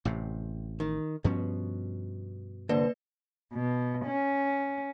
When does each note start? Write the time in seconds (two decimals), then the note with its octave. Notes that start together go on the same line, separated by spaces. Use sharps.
0.05 A1 A2 C3
0.80 D#3
1.24 G2 B2 F3 C#4
2.69 C2 D3 A#3 B4 D5
3.54 B2
4.06 C#4